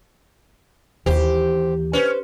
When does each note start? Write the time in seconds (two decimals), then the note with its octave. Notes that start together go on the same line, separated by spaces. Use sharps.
1.06 D#2 E3 G4 C5
1.93 C#4 B4 C5